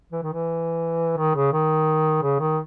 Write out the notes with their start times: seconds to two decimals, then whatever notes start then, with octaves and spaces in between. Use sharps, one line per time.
0.12 E3
0.23 D#3
0.33 E3
1.17 D#3
1.35 C#3
1.53 D#3
2.23 C#3
2.40 D#3